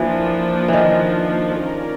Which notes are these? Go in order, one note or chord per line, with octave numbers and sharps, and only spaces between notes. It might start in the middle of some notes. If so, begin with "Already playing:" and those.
Already playing: E3 F3 A#3 D4
D#3 E3
C#4 F4 A#4 D5